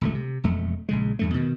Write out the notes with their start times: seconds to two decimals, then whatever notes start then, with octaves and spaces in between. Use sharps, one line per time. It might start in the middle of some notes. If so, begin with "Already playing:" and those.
0.01 D#1 C#2 A3
0.15 C3
0.44 E1 F2 A3
0.89 A#1 C#3 G#3
1.19 E2 G2 A3
1.34 B2 D#3